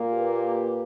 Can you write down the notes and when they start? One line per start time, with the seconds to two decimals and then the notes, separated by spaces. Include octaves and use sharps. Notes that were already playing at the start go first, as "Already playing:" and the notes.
Already playing: A#2 A#3
0.13 G4 B4